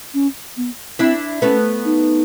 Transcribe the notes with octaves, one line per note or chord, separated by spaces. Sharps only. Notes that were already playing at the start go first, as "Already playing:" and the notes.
C#4
B3
C4 D4 E4
A3 B3 C#4
D#4